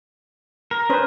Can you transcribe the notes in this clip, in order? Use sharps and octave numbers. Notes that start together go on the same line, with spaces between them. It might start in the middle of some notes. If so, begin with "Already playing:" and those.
A#4
C#4 B4 C5